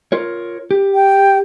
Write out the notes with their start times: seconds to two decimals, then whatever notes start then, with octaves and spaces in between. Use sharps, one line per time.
0.12 F4 A#4 C#5
0.71 G4
0.94 G5